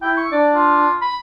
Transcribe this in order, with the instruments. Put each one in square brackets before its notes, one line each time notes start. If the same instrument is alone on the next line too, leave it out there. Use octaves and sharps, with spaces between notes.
[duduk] E4 [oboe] G5
[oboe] C#6
[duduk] D4 [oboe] D5
[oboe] F4
B5